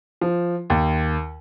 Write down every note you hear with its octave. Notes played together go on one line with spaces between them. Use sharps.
F3
D#2